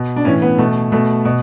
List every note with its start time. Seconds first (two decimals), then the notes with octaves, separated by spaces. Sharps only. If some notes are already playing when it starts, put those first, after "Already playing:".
Already playing: B2
0.16 D4
0.25 A2 E3 C#4
0.42 B3
0.58 B2 A3
0.92 B2 A3
1.25 B2